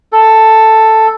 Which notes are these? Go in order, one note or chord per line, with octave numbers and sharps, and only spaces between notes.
A4